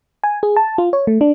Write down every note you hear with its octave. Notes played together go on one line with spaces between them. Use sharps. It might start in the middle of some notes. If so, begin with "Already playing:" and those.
G#5
G#4
A5
F4
C#5
A3
D4